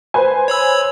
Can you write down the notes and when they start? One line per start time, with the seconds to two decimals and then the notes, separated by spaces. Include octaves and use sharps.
0.14 B4 C5 G#5
0.48 C#5 B5 E6